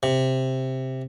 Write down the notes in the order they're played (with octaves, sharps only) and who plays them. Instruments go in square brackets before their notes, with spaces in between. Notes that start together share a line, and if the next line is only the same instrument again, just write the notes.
[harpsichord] C3